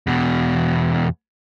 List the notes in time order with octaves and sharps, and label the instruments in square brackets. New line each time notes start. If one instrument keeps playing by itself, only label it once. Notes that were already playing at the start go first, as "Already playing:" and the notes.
[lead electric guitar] E2 B2